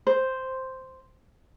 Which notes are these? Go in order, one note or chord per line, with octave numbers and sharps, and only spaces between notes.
C5